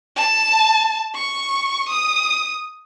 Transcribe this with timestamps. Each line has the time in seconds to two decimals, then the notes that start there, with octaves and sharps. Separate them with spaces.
0.16 A5
1.15 C#6
1.89 D#6